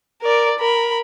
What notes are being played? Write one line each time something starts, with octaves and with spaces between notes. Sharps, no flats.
A#4 D5
A#4 B5